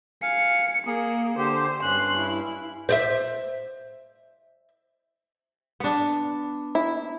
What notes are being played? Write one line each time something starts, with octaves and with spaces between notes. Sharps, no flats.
F5 G#5 C#7
A#3 G#4
D3 G4 C5
G2 C#4 C6 F#6
E4
C5 D5 E5
B3 D4
E4